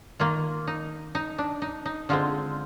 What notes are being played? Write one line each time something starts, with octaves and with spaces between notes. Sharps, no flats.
D#3 A#3 F4
D#4
D#4
D4
D#4
D#4
D3 G#3 C4 F4